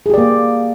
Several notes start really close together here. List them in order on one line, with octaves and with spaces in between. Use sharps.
G#4 G4 D5 A#3